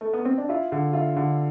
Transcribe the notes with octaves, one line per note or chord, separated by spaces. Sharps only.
A3
B3
C4
D4
E4 F4
D3
E4 F4
D3